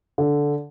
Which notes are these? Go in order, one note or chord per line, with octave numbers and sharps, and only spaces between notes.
D3